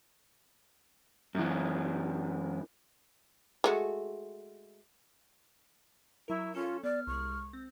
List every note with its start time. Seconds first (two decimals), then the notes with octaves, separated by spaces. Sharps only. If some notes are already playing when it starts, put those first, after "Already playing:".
1.35 F#2 E3
3.64 G#3 A3 F#4
6.28 F#3 E4 A#4
6.55 C#4 F4 A4
6.84 B3 D5 F6
7.07 C2 G#3 C#6
7.53 C4